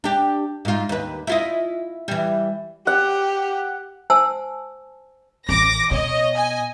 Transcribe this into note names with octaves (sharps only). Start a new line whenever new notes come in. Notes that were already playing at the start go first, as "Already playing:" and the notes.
D4 G4
G#2 F4
D#2 B4
E4 F4 D#5
E3 G3
G4 F#5
C5 F#5 G#5 A5 E6
A1 D6 A#6
B2 C#5 D#5
D#5 G#5